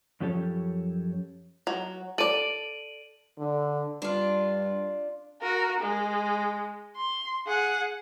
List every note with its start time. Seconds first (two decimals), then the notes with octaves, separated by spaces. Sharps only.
0.20 F#2 F3 C#4 G4 A4 C#5
1.67 F#3
2.18 A4 D5 D7 D#7 F#7
3.39 D3
4.02 G2 D4 F4
5.41 F#4 A#4
5.81 G#3
6.96 C6
7.47 G#4 F#5